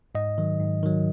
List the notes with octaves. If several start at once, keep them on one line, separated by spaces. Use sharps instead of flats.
G#2 D#5
D#3 F#3
G#2
D#3 F#3